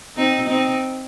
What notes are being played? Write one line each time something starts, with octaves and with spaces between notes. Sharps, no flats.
C4 D#4
C4 D#4